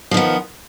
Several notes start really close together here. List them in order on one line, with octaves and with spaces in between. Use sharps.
F3 D#3 B3